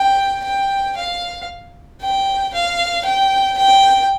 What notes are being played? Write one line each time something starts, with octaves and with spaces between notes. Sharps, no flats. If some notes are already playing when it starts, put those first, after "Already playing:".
Already playing: G5
G5
F5
G5
F5
G5
G5